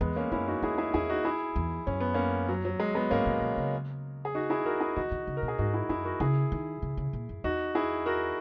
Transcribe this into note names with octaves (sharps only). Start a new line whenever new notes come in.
E2 G#3 B3
A#3 C#4
F#2 C#4 E4
D#4 F#4
E2 E4 G#4
E4 G#4
E2 E4 G#4
D#4 F#4
E4 G#4
E2
F#2 C#4
B3
A#3 C#4
F#3
F#3
G#3
G#3 B3
G#2 A#3 C#4
A#2
B2
C#3
G#4
D#4 F#4
E4 G#4
F#4 A#4
E4 G#4
D#3 D#4 F#4
D#3
C#3
A#4
B2
G#4
G#2 D#4 F#4
E4 G#4
F#2 E4 G#4
F#4 A#4
C#3 E4 G#4
D#3
C#3
C#3
A#2
F#2
E2 D#4 F#4
E4 G#4
F#4 A#4